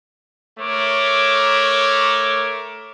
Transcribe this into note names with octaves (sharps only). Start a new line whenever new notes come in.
A3 A#4 C#5 D6